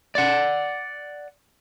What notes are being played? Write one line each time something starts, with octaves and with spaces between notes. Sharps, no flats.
D5 F#5